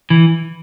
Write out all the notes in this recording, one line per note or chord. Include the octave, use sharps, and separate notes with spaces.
E3